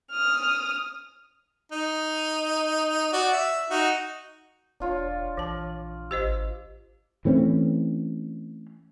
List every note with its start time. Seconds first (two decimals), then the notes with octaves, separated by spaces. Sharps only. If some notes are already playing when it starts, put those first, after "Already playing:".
0.12 D#6 F6
1.72 D#4
3.12 F#4 D5
3.32 E5
3.70 D#4 F#4
4.80 E1 D4 F4 C#5
5.37 A#1 E3 A5
6.11 G#1 G4 C5 D#5
7.25 E3 A3 C4 C#4